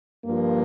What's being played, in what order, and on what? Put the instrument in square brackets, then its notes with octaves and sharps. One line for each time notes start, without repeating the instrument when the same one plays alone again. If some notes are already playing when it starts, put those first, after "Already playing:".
[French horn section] G2 F3 A#3